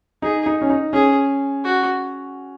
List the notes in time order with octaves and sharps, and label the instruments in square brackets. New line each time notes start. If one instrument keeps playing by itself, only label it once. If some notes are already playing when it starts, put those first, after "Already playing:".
[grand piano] D#4 [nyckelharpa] G#4
[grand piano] D#4
C#4
D#4
[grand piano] C#4 [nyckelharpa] G#4
[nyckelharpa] F#4